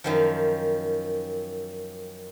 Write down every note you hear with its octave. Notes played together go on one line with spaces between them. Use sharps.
F#2 D#3 F3